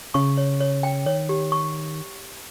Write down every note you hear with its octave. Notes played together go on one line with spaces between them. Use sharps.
C#3 C#6
C#5
C#5
G5
D#3 C#5
G4
C#6